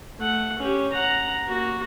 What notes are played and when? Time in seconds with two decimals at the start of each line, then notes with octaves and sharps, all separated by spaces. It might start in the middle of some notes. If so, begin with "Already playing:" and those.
0.19 A3 F#5
0.59 C#4 G4
0.92 F#5 A#5
1.48 A#3 F#4